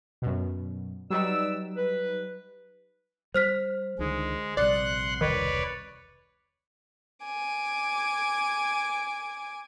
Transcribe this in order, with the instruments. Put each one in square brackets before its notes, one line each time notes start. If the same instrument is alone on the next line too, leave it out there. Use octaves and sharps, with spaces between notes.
[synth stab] F#2 B2
[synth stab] F#3 G3 D#4 [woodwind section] B4 D5 E6
[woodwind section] B4
[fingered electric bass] G3 [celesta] C5 F6 B6
[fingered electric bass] C#2 D3 D#3 [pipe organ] G#3
[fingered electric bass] A#1 C3 G3 [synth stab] D5 [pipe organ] F#5 C6 F#6
[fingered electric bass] E1 C2 [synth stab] D#3 [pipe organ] B4 C#5 D5
[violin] G#5 D6